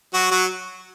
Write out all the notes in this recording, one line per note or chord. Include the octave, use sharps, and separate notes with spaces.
F#3 F#4
F#3 F#4